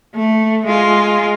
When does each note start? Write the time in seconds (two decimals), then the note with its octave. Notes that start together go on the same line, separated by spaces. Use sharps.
0.15 A3
0.66 G#3 F4